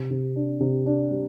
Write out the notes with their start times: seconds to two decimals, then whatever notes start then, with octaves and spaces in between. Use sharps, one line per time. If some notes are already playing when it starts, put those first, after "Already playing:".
Already playing: C3
0.11 C3
0.36 D4
0.60 C3
0.86 D4
1.11 G3